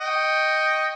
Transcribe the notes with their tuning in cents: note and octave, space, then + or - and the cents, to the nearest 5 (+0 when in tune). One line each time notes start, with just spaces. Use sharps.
D#5 +0 G5 +0 C#6 +0